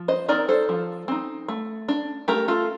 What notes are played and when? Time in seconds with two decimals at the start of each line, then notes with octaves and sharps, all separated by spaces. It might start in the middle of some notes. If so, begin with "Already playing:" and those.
Already playing: F3
0.08 C5 D#5
0.28 C4 D#4 A#4 D5
0.48 A4 C5
0.69 F3
1.08 C4 D#4
1.48 A3
1.88 D4
2.28 A3 G4 A#4
2.48 F4 A4